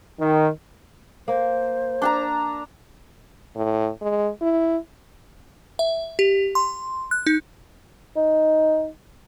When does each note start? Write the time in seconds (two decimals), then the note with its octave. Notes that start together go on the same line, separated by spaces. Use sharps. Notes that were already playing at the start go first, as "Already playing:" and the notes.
0.19 D#3
1.28 A#3 C5
2.02 D4 A5 A#5
3.56 A2
4.02 G#3
4.42 E4
5.79 E5
6.19 G4
6.55 C6
7.11 F#6
7.26 D#4
8.16 D#4